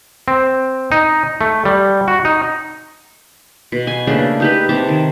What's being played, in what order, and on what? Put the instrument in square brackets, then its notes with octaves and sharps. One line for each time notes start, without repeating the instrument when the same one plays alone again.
[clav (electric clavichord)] C4
D#4
A3
G3
F#4
D#4
[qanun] B2
G#5
C#3 A3 A#3 D4
D#4 G4 B4
C3 A5 D6
D#3